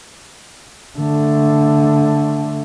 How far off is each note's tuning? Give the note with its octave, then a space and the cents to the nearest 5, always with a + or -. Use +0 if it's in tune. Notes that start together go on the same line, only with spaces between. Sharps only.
D3 +0 A3 +0